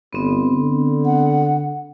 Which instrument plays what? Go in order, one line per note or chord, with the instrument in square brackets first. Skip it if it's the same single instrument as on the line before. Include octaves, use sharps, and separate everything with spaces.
[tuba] G1 [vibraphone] B3 C4
[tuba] D3
[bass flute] F#5